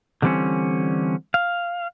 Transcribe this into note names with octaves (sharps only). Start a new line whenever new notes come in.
D3 E3 G3 A#3 C4 C#4
F5